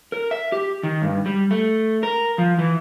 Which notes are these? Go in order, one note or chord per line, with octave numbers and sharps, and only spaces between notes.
A#4
E5
G4
D#3
G2
G3
A3
A#4
F3
E3